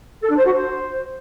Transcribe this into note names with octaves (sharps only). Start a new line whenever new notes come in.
A4
D4
C5
F#4
C5